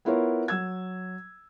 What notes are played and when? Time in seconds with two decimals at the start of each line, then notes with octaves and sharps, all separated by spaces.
0.05 B3 E4 F4 A#4 C#5
0.48 F#3 E6 G#6